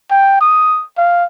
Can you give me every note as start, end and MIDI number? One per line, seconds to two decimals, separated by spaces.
0.10 0.38 79
0.41 0.83 87
0.97 1.24 77